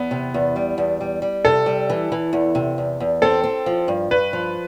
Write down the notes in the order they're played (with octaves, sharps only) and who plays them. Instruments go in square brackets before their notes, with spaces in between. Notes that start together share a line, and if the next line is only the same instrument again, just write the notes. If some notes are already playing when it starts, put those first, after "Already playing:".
Already playing: [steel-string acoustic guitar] E2 [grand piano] B3
[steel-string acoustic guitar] C3
E2
G3
E2
G3
G3
[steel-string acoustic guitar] C3 [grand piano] A4
[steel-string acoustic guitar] G3
E3
E3
E2
C3
E2
E2
[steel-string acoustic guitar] C4 [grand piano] A4
[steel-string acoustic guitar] C4
F3
G2
[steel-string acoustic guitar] G2 [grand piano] B4
[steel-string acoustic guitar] F3